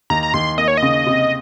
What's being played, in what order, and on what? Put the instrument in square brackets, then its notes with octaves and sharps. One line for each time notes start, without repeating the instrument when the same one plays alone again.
[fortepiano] D#2 [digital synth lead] A#5
[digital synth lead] A#5
[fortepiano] D#2 [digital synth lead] C6
[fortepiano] A#3 [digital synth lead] D#5
[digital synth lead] C#5
D#5
[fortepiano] C#3
C3